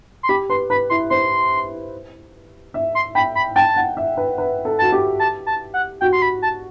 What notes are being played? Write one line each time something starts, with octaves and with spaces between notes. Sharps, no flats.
C6
G4 B5
B4 C6
B4 B5
E4 C6
C5 C6
E5
C6
G5 B5
B5
G5 A5
F#5
E5
B4
B4
A4
F#4 A5
G4
A5
A5
F#5
F#4 G5
C6
B5
A5